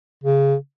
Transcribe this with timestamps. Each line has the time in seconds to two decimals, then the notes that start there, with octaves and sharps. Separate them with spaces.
0.24 C#3